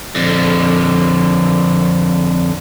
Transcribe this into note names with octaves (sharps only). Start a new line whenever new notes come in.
F2 D3